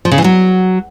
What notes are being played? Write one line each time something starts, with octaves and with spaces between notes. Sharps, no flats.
F3
C#3
E3
F#3